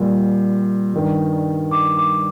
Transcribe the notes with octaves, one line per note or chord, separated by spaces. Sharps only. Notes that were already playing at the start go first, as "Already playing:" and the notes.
Already playing: A#2 G3
G2 D#3 G3
D6
D6